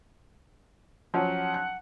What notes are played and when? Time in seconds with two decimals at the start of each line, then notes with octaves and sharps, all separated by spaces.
1.14 F3 F#3 C#4 F#5
1.54 F#6